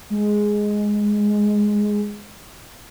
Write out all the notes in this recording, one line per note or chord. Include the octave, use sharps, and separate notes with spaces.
G#3